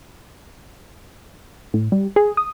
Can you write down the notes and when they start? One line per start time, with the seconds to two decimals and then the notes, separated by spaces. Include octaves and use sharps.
1.74 A2
1.92 G3
2.16 G#4
2.37 D#6